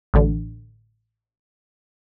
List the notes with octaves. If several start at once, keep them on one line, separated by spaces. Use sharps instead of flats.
A1 D3